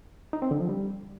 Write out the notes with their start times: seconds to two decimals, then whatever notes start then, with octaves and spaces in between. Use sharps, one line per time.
0.33 D#4
0.42 C4
0.51 D3
0.60 F3
0.69 G3